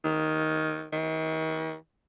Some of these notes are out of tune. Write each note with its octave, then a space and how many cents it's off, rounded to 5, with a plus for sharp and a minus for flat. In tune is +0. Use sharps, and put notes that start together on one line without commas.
D#3 +5
D#3 +40